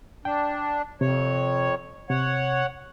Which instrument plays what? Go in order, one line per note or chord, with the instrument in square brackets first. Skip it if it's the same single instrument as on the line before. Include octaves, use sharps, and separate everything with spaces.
[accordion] D4 [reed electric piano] G5
[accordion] F2 C#5 [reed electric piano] C3
[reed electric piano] C3 [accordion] C#5 F#5